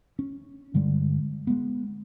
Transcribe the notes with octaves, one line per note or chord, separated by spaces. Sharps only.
C#4
G2 D3 G3 G#3
G#3 B3